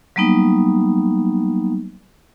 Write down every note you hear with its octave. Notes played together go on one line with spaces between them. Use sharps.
F#3 G3 A#3 B3 D#4